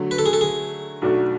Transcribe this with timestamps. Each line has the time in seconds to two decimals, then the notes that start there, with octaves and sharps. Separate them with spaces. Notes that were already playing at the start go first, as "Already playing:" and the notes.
Already playing: D3 F#3 A3
0.11 B4
0.19 A4
0.26 G#4
0.33 A4
0.41 G#4
1.02 B1 B2 A3 D4 F#4